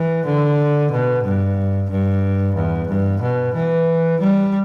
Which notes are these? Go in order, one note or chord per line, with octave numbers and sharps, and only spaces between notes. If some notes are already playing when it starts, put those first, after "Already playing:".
Already playing: E3
D3
B2
G2
G2
E2
G2
B2
E3
G3